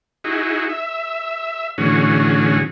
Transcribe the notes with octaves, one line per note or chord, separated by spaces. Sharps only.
D#4 E4 F#4 G#4
E5
A2 D3 E3 C#4 F#4 G#4